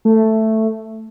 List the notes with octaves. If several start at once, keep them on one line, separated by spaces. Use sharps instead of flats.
A3